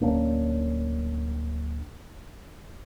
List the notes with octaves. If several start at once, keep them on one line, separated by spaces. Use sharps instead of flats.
D1 A#3 C#4 D4